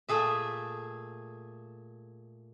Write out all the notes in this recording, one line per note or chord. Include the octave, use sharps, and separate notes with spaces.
A#2 A3 G#4 E5